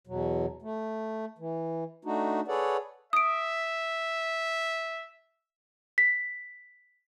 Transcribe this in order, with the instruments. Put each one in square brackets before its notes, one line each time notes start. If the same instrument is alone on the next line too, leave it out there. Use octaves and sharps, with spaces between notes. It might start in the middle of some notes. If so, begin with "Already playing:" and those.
[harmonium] E2 B2 F#3
A3
E3
A3 D4 D#4 F#4
G#4 A4 B4 C#5 D5 F#5
[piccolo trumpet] E5 [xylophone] D#6 D7
[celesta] B6